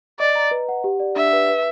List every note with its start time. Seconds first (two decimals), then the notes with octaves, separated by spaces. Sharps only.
0.20 D5 D#5
0.35 A#5
0.51 B4
0.69 F#5
0.84 G4
1.00 D5
1.16 D4 E5
1.33 B4
1.50 B4